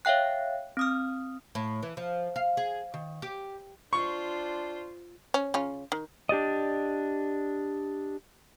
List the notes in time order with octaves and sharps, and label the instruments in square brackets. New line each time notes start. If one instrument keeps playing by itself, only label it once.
[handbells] C#5 E5 F5 G5 F#6
C4 D#6 F6
[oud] A2
E3
F3
F5
G#4
D#3
G4
[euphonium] D4 [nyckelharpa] F4 C5 [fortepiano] C#6
[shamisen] C#4
C#3 C#4 F4
D#3
[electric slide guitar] D4 G4 D5 D#5